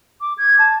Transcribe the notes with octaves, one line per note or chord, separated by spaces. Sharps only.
D6
G#6
A5